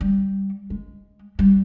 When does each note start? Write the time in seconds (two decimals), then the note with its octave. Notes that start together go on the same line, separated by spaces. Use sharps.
0.01 G3
0.70 G#3
1.39 G3